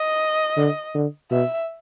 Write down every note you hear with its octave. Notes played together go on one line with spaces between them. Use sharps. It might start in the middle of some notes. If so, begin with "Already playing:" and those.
Already playing: D#5
D3
D3
B2 E5